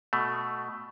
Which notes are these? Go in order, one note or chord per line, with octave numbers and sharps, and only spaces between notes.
B2 A3